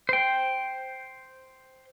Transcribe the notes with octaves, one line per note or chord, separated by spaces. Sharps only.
C5 G5